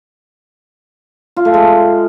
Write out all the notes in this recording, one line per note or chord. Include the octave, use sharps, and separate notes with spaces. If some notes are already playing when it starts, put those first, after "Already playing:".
F4
A3
G#3